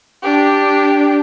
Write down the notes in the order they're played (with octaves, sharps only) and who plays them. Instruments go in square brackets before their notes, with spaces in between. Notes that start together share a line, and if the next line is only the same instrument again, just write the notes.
[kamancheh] D4 G4